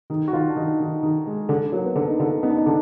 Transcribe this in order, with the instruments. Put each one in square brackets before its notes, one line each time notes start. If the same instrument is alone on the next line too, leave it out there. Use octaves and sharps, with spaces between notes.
[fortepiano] D#3
[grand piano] F#4
[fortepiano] D#3 [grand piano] F4
[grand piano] D4
[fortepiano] D#3 [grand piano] D#4
[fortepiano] D#3
D#3
G#3
D3
[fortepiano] F#3 [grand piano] A#3
[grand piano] B3
[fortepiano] D3 [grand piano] D4
[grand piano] D#4
[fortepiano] D3 [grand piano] F4
[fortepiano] B3 [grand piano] D#4
[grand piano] D4
D#4
[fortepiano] D3 [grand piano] D4